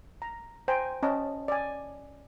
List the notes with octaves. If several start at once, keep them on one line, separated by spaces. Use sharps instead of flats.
A#5
C5 G5 G#5 A#5
C#4 D#5 A5
D5 G#5